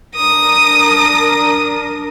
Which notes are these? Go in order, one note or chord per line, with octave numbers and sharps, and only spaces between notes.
D4 A#4 D#6